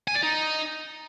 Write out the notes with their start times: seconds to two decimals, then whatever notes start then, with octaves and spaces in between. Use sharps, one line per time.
0.08 G#5
0.15 D5
0.23 D#4